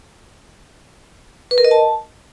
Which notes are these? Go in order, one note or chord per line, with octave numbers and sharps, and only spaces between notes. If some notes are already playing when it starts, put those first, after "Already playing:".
B4
A#4
D#5
A5